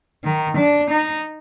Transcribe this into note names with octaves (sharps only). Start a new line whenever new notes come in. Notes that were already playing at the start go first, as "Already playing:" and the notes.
D#3
D4
D#4